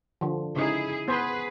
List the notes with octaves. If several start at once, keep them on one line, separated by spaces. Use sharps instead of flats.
D3 F3
C#3 D#4 E4 G#4
B3 G#4 B4 C5